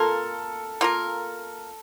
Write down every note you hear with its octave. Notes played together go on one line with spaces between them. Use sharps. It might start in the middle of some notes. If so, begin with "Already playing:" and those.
Already playing: A#3 F4 A4 A#4
A#3 F4 A#4